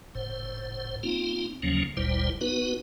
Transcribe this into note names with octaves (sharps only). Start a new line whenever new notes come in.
F#1 A2 C5
A#3 C4 D#4 F4
D#2 C#3 F3 F#3 A#3 C#4
G1 D2 A#2 G3 E4 C5
B3 D#4 F#4 B4